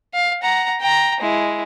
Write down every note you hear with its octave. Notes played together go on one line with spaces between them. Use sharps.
F5
F#5 A#5
G5 A#5
G#3 E4